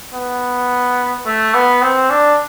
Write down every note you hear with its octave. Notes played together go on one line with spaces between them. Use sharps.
B3
A3
B3
C4
D4